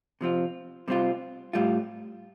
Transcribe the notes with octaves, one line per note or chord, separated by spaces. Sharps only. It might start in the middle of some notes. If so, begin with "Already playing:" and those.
C3 F3 C4 F4
C3 G3 C4 F4
A2 G3 F4